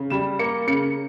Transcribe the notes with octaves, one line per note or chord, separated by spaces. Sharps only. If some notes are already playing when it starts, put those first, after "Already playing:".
Already playing: C#3
G3 E7
A#3 C#7
C#3 C#7